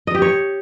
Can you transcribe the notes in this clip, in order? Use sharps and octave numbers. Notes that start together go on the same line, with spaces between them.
D#5
G4
C#5